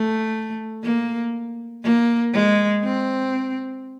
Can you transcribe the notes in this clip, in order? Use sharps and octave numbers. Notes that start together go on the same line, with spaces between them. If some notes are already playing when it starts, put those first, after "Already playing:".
Already playing: A3
A#3
A#3
G#3
C4